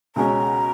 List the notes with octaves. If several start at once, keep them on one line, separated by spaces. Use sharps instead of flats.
C#2 B2 G#3 C#4 A#5